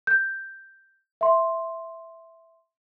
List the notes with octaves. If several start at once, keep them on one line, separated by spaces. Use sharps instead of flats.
G6
E5 C6